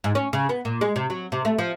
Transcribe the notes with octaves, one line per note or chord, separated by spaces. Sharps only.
G#2
C#4
C#3
B3
A#2
G#3
C3
F#3
C3
A3
F3